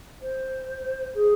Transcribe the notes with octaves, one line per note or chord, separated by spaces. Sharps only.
C5
G#4